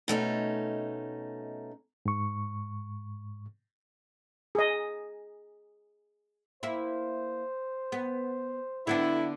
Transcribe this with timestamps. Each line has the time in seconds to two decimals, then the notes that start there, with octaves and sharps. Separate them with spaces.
0.08 B2 A3 C#4 D#4
2.06 G#2 C#6
4.55 G#4 D#5
6.63 A#3 E4 C5
7.92 B3
8.87 D3 B3 D4 E4